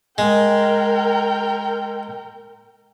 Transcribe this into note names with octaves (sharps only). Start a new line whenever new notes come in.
G#3 A#4 G5